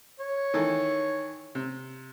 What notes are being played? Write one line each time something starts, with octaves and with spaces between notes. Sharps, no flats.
C#5
D#3 E3 A4
C3